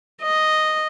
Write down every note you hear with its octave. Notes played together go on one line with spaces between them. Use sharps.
D#5